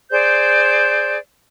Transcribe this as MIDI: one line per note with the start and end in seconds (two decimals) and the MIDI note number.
0.11 1.17 68
0.11 1.17 72
0.11 1.17 74
0.11 1.17 91